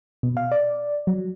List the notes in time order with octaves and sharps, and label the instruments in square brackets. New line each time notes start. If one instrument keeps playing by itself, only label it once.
[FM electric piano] B2
F5
D5
F#3